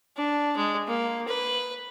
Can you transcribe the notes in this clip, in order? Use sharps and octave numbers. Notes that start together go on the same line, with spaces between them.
D4
G#3
A#3
B4